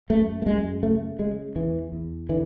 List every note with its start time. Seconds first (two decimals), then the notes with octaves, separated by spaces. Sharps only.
0.10 F#2 A3
0.42 A3
0.46 F#2 G#3
0.83 C#3 A3
1.19 C#3 G#3
1.56 E2 E3
1.92 E2
2.29 D3 E3